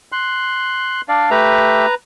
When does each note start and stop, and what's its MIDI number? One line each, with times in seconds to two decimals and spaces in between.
0.12 1.01 84
0.12 1.01 90
1.09 1.30 62
1.09 1.30 74
1.09 1.30 77
1.31 1.86 57
1.31 1.86 67
1.31 1.95 71
1.31 1.86 76
1.31 1.95 82